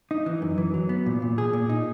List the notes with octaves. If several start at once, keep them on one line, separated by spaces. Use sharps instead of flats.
D#4
E3
F#2
E3
F#3
B3
A#2
A#2
G#4
A#2
D#4